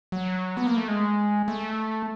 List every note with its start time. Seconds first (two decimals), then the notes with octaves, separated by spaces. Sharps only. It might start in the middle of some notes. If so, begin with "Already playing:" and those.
0.12 F#3
0.57 B3
0.67 A#3
0.77 A3
0.88 G#3
1.48 A3